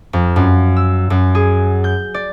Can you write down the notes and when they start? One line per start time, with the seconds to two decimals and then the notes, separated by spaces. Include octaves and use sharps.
0.13 F2
0.36 F#2
0.77 E6
1.10 F#2
1.35 G#4
1.84 G6
2.14 D5